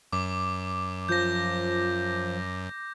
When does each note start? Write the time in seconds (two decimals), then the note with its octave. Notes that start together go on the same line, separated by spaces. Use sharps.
0.13 F#2 D6
1.09 F3 G6 A#6